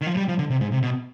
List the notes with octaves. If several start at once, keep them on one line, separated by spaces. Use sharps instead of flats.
D#3
F3
G3
F3
D3
C3
G#2
C3
B2